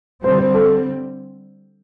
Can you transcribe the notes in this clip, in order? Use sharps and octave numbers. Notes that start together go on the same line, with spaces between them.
D3 G3 C4 C5
C5
A4